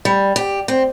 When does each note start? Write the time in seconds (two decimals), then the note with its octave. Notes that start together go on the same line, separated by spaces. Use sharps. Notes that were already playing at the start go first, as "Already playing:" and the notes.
0.05 G3
0.36 G4
0.68 C4